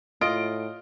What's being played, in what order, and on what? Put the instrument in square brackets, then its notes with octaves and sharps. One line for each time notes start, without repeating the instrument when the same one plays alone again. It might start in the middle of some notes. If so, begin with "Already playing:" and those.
[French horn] A2 [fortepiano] F4 [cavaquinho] D#5 [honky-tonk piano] D7